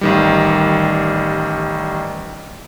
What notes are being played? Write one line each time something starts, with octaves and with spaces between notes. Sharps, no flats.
A1 D#3 G3